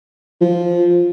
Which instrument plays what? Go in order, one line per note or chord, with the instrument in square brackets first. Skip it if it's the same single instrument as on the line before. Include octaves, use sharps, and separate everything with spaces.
[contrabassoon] F3